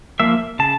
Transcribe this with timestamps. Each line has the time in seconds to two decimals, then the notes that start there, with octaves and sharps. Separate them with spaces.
0.20 F3 A#3 E5
0.59 C#3 A5